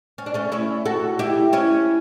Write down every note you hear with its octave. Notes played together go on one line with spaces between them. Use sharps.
C#4
D4
A3 C#4
C#4 E4
F#4 A4
E4 G4
C#4 E4